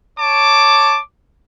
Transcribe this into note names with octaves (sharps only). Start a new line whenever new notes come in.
C#5 A5 D6